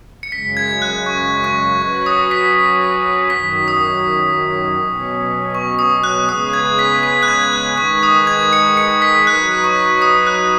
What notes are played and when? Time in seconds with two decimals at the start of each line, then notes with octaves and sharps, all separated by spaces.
0.23 C#7
0.32 F#2 C#3 G#3 B6
0.57 G#6
0.82 F#6
1.06 C#6
1.44 C#6
1.81 F#3 C#4 F#4 B4 C#6
2.06 D#6
2.31 B6
3.30 F#2 D#3 F#3 B6
3.68 D#6
4.79 B2 F#3 C#4
5.55 C#6
5.79 D#6
6.04 F#6
6.29 C#3 G#3 B3 G#4 B4 D#6
6.53 G#6
6.79 B6
7.03 B6
7.23 F#6
7.28 G#6
7.53 F#6
7.77 D#3 G#3 D#4 B4 C#6
8.03 D#6
8.27 G#6
8.53 C#7
8.77 C#7
9.02 B6
9.27 F#3 D#4 B4 F#6
9.64 C#6
10.02 D#6
10.27 F#6